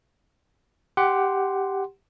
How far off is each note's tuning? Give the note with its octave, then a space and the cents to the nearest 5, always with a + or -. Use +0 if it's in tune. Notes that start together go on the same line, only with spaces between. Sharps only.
G4 +0 F#5 +15 C6 +0